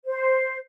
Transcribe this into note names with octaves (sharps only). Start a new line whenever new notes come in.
C5